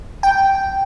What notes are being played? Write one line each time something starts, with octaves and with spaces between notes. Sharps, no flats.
G5